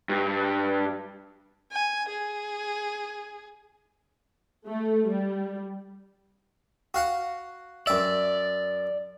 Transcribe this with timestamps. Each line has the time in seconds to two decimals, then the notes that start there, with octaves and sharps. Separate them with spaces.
0.09 G2
1.71 G#5
2.09 G#4
4.66 A3
5.09 G3
6.94 F#4 F5 F#5
7.87 F#2 D5 E5